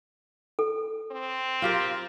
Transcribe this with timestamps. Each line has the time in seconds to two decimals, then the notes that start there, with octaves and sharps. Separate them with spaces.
0.59 A4
1.12 C4
1.62 F4 G4 A#4